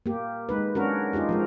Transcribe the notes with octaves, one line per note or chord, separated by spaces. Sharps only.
A#3 G4
G#3 D#4 B4
C#4 D4 F#4 A#4
D#4 F4 G4 G#4
F3 G#3 A#4